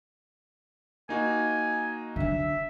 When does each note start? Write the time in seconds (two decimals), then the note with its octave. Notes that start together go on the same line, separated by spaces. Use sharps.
1.09 A#3 D#4 F#4 G#5
2.16 D3 F#3 E5